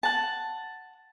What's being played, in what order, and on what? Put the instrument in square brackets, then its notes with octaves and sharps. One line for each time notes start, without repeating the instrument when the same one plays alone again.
[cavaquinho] F#5 A5